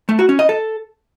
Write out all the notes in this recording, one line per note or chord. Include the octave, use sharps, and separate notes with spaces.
A3
F#4
C#4
D#5
A4